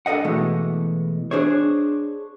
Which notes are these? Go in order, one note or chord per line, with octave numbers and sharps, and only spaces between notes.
D4 A4 A#4 D#5 F#5
B2 E3 G#3 A3
D4 G#4 C5 C#5